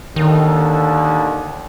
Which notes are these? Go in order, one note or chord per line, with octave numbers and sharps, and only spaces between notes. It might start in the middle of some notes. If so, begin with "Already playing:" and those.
D#2 D3 D#3 A4